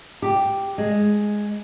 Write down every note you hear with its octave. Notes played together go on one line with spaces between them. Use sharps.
G4
G#3